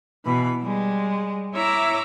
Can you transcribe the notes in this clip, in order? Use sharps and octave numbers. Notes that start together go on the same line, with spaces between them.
B2 E3 B5
G3 G#3
E4 C#5 E5 A#5 D6